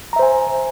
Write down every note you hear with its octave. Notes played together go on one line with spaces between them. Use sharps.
C5 E5 G#5 A#5